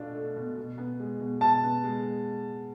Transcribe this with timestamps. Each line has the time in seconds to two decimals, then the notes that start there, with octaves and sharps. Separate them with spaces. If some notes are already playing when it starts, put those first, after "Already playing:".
Already playing: B2 A3 D4 F4
0.14 A3
0.36 B2
0.57 B2
0.78 B3
1.00 G#3
1.20 B2
1.41 B2 A5
1.63 B3
1.84 G#3